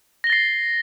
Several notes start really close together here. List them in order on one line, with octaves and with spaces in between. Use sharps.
A#6 G7 A6 C7